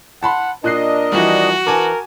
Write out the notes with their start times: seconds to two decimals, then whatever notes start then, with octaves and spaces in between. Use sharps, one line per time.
0.23 F#5 A5 B5 C6
0.64 A#2 D4 A#4 D#5 F#6 C7
1.12 E3 F3 G3 F#4
1.67 E3 A#4 G#5 A5 D6